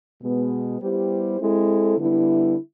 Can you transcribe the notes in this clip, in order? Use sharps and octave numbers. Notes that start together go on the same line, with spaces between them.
B2 G#3 B3
G3 B3 E4 G4 C5
G#3 C4 E4 A4
D3 G3 B3 E4